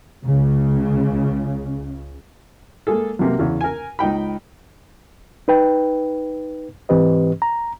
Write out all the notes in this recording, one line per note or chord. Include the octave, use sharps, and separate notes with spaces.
C#2 C#3
G#3 A#3 G#4 A4
B1 C3 A#3
E2 C#3
A#4 G#5
C#2 D#4 G5 B5
D#4 B4 G5
G#2 E3 C4 G4 B4 D#5
A#5